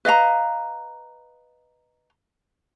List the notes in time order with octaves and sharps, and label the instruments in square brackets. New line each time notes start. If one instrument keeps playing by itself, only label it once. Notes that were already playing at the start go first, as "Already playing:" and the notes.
[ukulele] B4 D#5 F5 A#5